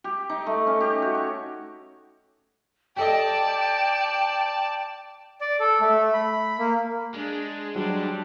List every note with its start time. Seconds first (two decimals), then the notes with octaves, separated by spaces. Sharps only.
0.04 G4
0.29 D#4
0.46 A3
0.67 C#4
0.80 G4
1.02 F#4
1.15 C#5
2.96 G4 A4 D5 D#5 G5 A5
5.41 D5
5.60 A4
5.81 A3
6.14 B5
6.58 A#3
7.15 G#3 D4 G#4
7.75 F#3 G3 D4 C5